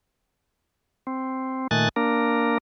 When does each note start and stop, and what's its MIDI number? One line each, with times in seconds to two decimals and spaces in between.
1.07 1.67 60
1.71 1.89 46
1.71 1.89 51
1.71 1.89 57
1.71 1.89 80
1.71 1.89 90
1.71 1.89 93
1.96 2.58 58
1.96 2.58 62
1.96 2.58 70